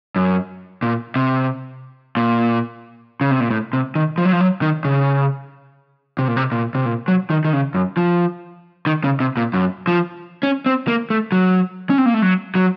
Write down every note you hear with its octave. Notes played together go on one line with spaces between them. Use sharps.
F#2
A#2
C3
A#2
C#3
C3
A#2
A2
C3
D#3
F3
F#3
F3
F#3
D#3
C#3
C3
A#2
C3
A#2
C3
A#2
F#3
D#3
D#3
C#3
F#2
F3
D#3
C#3
C3
A#2
F#2
F3
C#4
C4
A#3
A3
F#3
C#4
C4
A#3
A3
F#3
F#3